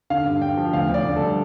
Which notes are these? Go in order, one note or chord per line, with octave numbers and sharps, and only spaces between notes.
D3 F5
G2
G2 G5
F3
D2 F5
D2
D5
D2
A4
G3